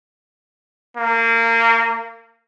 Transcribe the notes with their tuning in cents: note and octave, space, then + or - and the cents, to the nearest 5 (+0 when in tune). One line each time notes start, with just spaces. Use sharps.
A#3 -25